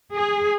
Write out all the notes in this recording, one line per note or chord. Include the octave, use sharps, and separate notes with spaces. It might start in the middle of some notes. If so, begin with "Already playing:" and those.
G#4